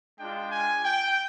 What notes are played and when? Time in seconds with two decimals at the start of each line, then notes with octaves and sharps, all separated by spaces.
0.19 G#3 D4 F4 G5
0.52 G#5
0.85 G5